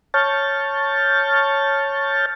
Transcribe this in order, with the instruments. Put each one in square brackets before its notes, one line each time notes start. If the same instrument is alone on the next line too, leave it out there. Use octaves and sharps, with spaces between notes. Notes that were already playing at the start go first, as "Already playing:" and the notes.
[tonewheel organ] C#5 A5 C#6 F6 G6 A6